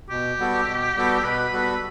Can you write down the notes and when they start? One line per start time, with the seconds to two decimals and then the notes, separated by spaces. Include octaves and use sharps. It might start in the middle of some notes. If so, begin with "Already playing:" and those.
0.10 B2 G4
0.39 G3 B3 F#4 A4
0.66 B2
0.95 G3 B3 F#4 A4
1.24 B2 B4
1.52 G3 B3 F#4 A4